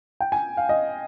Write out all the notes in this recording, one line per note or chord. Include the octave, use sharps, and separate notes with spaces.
G5
G#5
F5
D#5